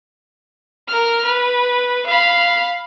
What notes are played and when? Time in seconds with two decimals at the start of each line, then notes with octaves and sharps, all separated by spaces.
0.88 A#4 F6
1.25 B4
2.07 F5 B5